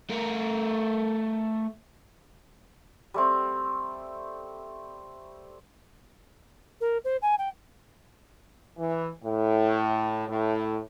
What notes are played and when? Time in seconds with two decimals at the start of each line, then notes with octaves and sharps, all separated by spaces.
0.10 A3 A#4
3.14 G3 A3 C4
6.81 A#4
7.05 C5
7.22 G#5
7.39 G5
8.77 E3
9.23 A2
10.28 A2